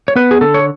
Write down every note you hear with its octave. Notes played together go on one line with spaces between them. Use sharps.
C#5
B3 B4
G#4
D3 A4
C#5